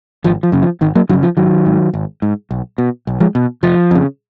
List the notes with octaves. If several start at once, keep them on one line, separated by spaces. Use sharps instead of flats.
G#1 F3
F3
F#2 C#3
F3
G#1 D#3
F#3 A#3
F#2 C#3 D#3 F#3
F3
G#1 D#3 F#3
G#2
G#1
G#2
B1
B2
B1
F3 G#3
B2
F1 F3
F2 C#3